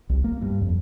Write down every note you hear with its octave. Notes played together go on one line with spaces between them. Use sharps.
C2
A#3
G2
F2